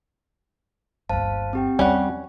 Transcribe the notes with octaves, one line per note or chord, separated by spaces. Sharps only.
G1 D#2 C5 F5 A5
C4 G4 G5
E2 G3 C#4 F#5